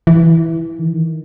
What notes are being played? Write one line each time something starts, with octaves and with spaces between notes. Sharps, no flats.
E3
D#3
E3
D#3